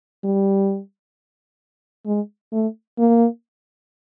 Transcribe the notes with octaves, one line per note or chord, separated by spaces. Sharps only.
G3
G#3
A3
A#3